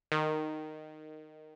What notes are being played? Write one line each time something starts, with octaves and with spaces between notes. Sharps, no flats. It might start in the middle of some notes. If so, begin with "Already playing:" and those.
D#3